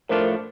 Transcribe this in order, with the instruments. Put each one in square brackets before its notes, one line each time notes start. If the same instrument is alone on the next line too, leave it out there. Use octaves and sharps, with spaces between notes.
[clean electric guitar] A2 F3 A3 D4 F4 [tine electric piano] A#4 C5